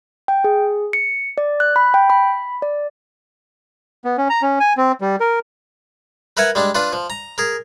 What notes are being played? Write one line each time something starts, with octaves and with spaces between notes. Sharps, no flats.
G5
G#4
C#7
D5
F#6
B5
G5
B5
D5
B3
C#4
A#5
C#4
G#5
C4
G3
A#4
A#4 B4 E5 F#5 G#5
G3 G#3 D4
D4 F4 B4
F3
A#5
G#4 A#4